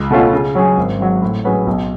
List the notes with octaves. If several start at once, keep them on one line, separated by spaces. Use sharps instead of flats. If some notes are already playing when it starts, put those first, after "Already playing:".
Already playing: C#2
B2 A3 C#4 F4
C#3
F#3 C#4 G#4
G#1
G#2 F#3
A2
F#3 C#4 G#4 B4
B1